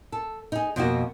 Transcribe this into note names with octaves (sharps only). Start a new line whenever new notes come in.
A4
D#4 G#4
F2 B2 A#3 F#4